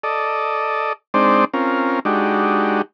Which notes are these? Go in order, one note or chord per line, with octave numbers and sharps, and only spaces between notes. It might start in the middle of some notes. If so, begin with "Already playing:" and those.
A4 D5 D#5
G#3 C4 D4 D#4 C5 D5
C4 C#4 F4 A#4
G#3 D4 D#4 F#4 G4